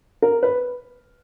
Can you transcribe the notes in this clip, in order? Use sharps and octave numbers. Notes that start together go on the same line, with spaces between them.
A#4
B4